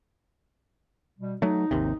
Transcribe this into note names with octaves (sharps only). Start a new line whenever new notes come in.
B2 G3
F#3 A3 D#4
G#1 D#2 C3